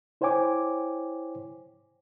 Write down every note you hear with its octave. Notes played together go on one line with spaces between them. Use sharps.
E4 C5 C#5 G5 G#5 D6